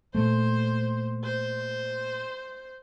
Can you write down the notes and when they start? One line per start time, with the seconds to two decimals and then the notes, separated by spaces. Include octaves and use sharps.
0.14 A#2 A3 C5
1.24 C5